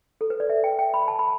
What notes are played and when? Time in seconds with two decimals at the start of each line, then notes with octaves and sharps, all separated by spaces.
0.21 A4
0.30 B4
0.40 D5
0.50 E5
0.64 G5
0.79 G5
0.94 B5
1.08 A5
1.19 B5